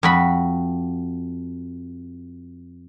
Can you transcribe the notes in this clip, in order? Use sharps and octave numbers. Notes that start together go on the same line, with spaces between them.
F2 F#4 B5